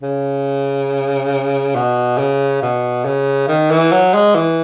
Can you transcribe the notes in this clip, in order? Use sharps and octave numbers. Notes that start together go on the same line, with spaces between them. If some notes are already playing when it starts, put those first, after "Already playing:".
C#3
B2
C#3
B2
C#3
D#3
E3
F#3
G#3
E3